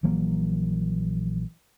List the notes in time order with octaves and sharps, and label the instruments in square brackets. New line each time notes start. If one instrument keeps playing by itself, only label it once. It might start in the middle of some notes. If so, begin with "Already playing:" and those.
[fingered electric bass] A#1 E3 F#3 A#3